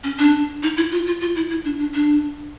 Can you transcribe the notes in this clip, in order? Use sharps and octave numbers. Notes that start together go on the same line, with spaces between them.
C#4
D4
D#4
E4
F4
F4
F4
E4
E4
D4
D4
D4